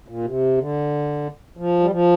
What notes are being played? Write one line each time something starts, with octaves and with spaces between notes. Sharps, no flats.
A#2
C3
D3
F3
G3
F3